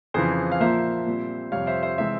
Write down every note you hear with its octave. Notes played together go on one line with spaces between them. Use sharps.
F2 C#3 E3 G#4 C5
F5
A#2 F3 A#3 C5 E5
A#2 G3 C4
F2 C3 G3 C#5 F5
C5 E5
C5 E5
C3 E3 G#3 C4 C5 E5